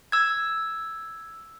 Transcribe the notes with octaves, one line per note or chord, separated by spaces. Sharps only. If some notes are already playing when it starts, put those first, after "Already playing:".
E6 G#6